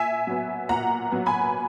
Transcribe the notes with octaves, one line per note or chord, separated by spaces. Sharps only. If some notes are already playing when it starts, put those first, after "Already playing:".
Already playing: A#2 E5 G#5
F#3 B3
A#2 F#5 A#5
F#3 B3
G#5 B5